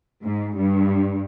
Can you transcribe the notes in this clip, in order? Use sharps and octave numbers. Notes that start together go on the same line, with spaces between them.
G#2
G2